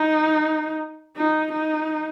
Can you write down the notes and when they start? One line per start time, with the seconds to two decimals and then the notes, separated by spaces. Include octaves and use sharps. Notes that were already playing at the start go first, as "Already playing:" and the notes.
Already playing: D#4
1.17 D#4
1.52 D#4